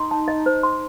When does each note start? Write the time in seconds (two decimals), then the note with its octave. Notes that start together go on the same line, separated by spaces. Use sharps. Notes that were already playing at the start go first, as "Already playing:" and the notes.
Already playing: D#4 C6
0.11 A5
0.28 D#5
0.46 C5
0.63 C6